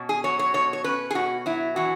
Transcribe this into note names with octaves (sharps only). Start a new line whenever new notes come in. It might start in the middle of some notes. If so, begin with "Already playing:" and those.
Already playing: B2 C#4
G#4
F#3 C#5
C#5
B2 C#5
C#5
C#4 B4
G#4
B2 F#4
F#3 E4
E3 F#4